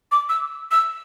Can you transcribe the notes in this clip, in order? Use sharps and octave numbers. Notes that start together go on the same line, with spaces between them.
D6
E6
E6